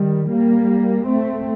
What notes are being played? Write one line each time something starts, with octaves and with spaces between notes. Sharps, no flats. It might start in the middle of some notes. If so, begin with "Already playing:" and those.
Already playing: D#3 G3
G3 A#3
A3 C4